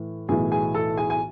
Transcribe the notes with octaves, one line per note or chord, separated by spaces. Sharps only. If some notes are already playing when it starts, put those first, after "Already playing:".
Already playing: A2 E3
B1 A2 E3 G#4 G#5
G#4 G#5
A4 A5
G#4 G#5
G#5